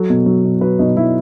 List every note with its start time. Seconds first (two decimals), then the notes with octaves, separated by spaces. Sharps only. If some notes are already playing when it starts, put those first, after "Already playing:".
Already playing: F#3 A4
0.10 B2
0.26 F#3
0.45 B2
0.61 F#3 B4
0.79 B2 D#4
0.97 F#3 E4